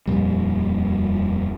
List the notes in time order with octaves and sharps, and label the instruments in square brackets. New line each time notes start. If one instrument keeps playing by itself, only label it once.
[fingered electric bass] D#1 F2 A#2 G3